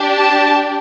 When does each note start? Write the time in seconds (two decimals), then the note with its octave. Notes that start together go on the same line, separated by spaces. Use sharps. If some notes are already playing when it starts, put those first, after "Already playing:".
Already playing: D4 G4
0.16 A5